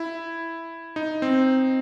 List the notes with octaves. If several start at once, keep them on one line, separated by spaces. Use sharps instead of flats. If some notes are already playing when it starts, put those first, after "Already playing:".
Already playing: E4
D#4
C4